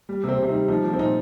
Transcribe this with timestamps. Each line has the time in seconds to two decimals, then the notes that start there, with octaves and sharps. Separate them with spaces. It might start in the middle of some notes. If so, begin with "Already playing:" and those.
0.09 G3
0.24 C3 C4
0.38 C3 C4
0.49 D#4
0.54 G3
0.68 F3 D#4
0.84 F3
0.93 C4
0.99 A#2 D#4